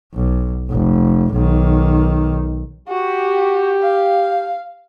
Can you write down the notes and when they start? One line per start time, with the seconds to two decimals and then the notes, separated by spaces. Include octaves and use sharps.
0.14 B1
0.71 F1
1.34 B1 D#3
2.89 F#4 G4
3.82 F5